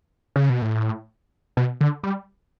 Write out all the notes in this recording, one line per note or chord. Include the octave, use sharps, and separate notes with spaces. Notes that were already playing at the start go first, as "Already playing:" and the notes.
C#3
B2
A2
B2
D3
G3